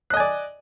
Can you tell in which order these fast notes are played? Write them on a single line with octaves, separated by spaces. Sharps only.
F#6 D#5 G#5 D5